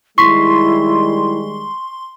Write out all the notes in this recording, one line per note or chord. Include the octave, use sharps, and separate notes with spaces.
D#3 G3 G#3 E4 C6 C#6 B6